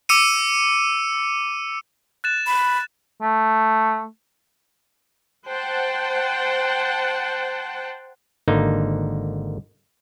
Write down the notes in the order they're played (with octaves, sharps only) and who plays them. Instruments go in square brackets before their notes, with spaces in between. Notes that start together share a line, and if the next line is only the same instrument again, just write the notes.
[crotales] D6 E6 C#7 D#7
F#6 A6 E7
[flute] B5
[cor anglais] A3
[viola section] C5 F#5 G5 A5
[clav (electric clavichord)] G#1 D3 A#3 D#4